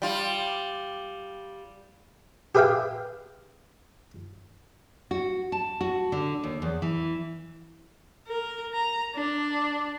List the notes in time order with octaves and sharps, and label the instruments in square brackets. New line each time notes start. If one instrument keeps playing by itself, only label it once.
[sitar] G3 F4
[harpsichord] G4 G#4 B4 E5 F5 G5
[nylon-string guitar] F#4
A5
F#4
D3
D#2
E2
E3
[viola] A#4
A#5
D4